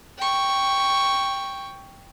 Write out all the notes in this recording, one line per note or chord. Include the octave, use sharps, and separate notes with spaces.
G5 C#6